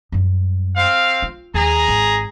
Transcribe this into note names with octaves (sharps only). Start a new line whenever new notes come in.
F#2 G3
C4 F5
F4
D#2 G#4 A#5
G#1